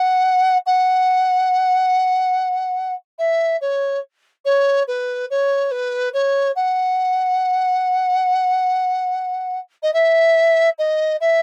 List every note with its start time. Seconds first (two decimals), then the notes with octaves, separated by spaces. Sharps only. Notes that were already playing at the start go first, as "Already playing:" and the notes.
Already playing: F#5
0.66 F#5
3.19 E5
3.61 C#5
4.45 C#5
4.88 B4
5.30 C#5
5.71 B4
6.14 C#5
6.56 F#5
9.83 D#5
9.94 E5
10.79 D#5
11.21 E5